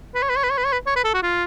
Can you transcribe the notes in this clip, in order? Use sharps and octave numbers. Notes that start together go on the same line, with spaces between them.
B4
C#5
B4
C#5
B4
C#5
B4
C#5
B4
C#5
B4
A4
F#4
F4